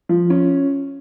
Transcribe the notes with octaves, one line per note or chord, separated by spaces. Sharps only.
F3
C#4